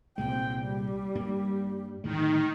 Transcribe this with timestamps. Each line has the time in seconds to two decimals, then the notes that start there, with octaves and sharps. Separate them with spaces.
0.18 C2 A#2 G#3 C4 G5
0.62 G3
1.15 G2 A#3
2.04 D1 A2 D#3 G#3